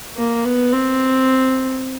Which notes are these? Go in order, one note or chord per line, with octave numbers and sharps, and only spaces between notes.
A#3
B3
C4